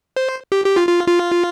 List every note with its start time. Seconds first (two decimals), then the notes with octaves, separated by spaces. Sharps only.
0.16 C5
0.52 G4
0.65 G4
0.76 F4
0.88 F4
1.07 F4